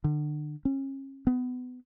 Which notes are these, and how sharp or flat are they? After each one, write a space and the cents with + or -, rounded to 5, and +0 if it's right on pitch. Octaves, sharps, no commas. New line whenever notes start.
D3 +35
C#4 -35
B3 +25